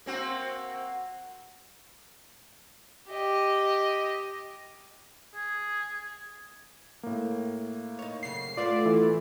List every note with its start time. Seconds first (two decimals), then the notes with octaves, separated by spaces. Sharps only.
0.06 A#3 C4 F#4
3.09 G4 D#5
5.35 G#4
7.03 A2 A#3
7.99 D#4 C#5
8.23 F#2 C#3 C7
8.57 A2 A3 B3 F4 D5
8.85 E3